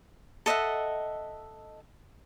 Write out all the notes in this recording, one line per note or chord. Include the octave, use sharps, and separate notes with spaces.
A4 D#5 E5 F#5